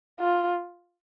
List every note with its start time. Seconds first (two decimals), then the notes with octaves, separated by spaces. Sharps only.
0.20 F4